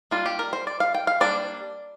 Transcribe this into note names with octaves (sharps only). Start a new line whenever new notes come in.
G3 A#3 D4 F4
G4
A#4
C5
D5
F5
G5
F5
G3 A#3 D4 D5